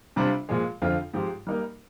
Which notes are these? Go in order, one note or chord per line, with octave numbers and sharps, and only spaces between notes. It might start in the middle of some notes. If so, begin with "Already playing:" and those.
C3 G3 D4 F4 C5
A#2 F3 G#3
F2 D3 F3 C4 F4
G#2 F3 C4 G4
G3 A#3 D#4 A#4